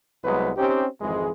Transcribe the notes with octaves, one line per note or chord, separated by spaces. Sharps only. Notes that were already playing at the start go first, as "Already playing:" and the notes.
C2 F#3 G#3 B3 B4
C4 C#4 D#4 G4
G#1 F2 E3 G#3